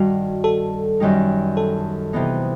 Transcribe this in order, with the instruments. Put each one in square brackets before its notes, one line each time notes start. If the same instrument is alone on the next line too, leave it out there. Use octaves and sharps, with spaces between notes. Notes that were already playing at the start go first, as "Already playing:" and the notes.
Already playing: [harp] G2 D#3 G3 [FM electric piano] F#4
[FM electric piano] A4
[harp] F#2 D#3 G3 D#4
[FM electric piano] A4
[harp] C3 E3 B3 D#4